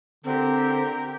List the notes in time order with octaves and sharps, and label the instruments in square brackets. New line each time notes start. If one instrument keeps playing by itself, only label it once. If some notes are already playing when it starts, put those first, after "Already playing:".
[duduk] D3 [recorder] C4 [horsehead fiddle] G4 A#4